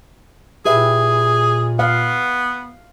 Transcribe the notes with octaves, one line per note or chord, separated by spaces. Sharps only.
A#2 G4 G#4 B4 E5
B3 F5